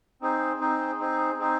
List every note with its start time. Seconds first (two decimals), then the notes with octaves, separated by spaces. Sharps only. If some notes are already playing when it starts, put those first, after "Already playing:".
0.21 C4 D#4 G#4 C5
0.60 C4 D#4 G#4 C5
1.00 C4 D#4 G#4 C5
1.39 C4 D#4 G#4 C5